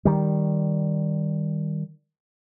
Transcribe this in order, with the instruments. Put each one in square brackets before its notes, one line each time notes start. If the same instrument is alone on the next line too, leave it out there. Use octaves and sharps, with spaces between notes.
[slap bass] D#3 G3